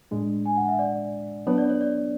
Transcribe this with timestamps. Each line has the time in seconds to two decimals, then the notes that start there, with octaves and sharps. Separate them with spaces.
0.11 A2 G#3 D4
0.46 G#5
0.57 F#5
0.68 E5
0.79 D5
1.47 F#3 B3 D4 C#5
1.58 D5
1.70 C#5
1.81 D5